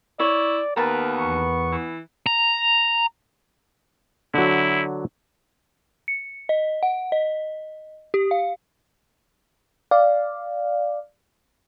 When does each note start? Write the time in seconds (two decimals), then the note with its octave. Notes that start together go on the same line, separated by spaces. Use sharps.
0.20 E4 C#5 D5
0.76 D#2 B3 A#4 B4 A5
1.18 E2 C#6
1.72 E3
2.26 A#5
4.34 D3 F#3 E4
6.08 C#7
6.49 D#5
6.83 F#5
7.12 D#5
8.14 G4
8.31 F5
9.91 D5 F5